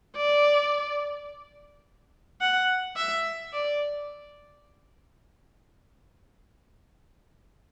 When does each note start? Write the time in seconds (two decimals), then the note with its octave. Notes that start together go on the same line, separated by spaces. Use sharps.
0.16 D5
2.41 F#5
2.96 E5
3.53 D5